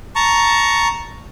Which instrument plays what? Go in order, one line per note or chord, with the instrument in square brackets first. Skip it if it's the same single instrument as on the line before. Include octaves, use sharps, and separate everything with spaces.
[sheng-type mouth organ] A5 A#5 C#6